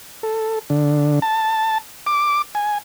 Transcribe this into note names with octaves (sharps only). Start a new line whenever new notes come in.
A4
D3
A5
D6
G#5